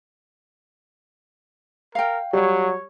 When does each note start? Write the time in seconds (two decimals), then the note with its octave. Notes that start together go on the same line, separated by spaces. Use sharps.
1.95 A#4 F5 G5
2.33 F#3 G3 C#5